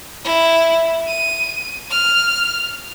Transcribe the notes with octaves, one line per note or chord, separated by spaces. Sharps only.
E4
D#7
F6